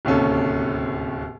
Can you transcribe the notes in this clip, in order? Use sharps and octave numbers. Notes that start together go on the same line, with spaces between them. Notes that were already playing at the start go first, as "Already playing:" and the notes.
D1 D#2 C3 C#4 A4